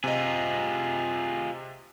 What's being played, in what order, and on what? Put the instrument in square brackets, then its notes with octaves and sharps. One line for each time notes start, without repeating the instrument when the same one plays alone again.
[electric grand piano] C3 D#5 [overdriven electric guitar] F4 G#4